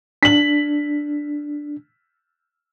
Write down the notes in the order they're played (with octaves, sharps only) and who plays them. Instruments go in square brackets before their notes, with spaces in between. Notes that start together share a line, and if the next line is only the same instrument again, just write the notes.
[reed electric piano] D4 [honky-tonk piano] B6 F#7